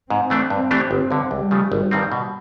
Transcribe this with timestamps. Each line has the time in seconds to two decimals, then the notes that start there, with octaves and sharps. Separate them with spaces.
0.10 G#2 C4
0.30 E3 A3 D4
0.50 G2
0.71 E3 A3 D4 G4
0.91 G1
1.11 G2 D3
1.31 C#2 G3
1.51 C#3 F3 A3
1.72 G#1
1.91 G2 D#3 G3 C4
2.12 B2